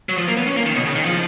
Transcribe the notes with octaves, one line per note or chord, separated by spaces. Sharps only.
F#3
F3
A#3
B3
C#4
A#3
D#3
B2
C#3
D#3
F3